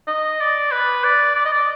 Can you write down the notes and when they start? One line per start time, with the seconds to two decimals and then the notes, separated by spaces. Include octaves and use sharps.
0.08 D#5
0.41 D5
0.72 B4
1.04 D5
1.36 D5
1.45 D#5
1.52 D5